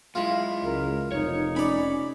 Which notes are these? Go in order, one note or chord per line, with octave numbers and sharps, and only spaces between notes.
F#2 G#3 E4 F4
C#2 A#4
F1 D#4 C#5
C#4 D5 B5